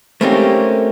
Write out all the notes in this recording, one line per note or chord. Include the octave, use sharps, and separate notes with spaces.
A3 A#3 C4 C#4 D#4 G4